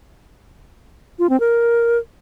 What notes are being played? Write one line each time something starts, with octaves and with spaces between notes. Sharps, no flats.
F4
C4
A#4